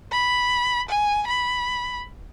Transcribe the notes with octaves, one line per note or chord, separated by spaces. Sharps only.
B5
G#5
B5